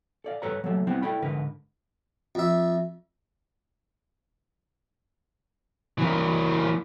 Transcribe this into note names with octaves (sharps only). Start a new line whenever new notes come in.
A4 D5 F5
G2 A4 B4 C#5 A#5
F#3 A3 A#3 A4
G3 B3 C4 E4
E4 A4 D5 G5 B5
G#2 D3 A#4 B4
F2 E5
E3 A#3